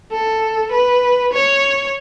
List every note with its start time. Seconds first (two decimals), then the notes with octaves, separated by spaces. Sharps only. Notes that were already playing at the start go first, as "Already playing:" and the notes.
0.11 A4
0.71 B4
1.33 C#5